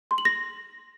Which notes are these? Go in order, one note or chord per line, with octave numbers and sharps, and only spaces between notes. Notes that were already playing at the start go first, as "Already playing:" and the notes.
C6
F#7
A#6